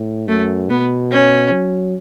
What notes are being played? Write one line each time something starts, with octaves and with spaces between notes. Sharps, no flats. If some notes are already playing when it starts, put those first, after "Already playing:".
Already playing: A2
F#2 A3
B2 B3
C#4
F#3